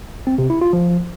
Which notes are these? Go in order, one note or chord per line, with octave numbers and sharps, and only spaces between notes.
C4
C3
E4
F4
F3